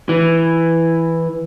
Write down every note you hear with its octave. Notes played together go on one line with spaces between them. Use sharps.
E3